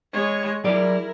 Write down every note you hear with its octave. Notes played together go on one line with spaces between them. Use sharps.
G#3 C#5
F#3 E4 G#4 A#4 D5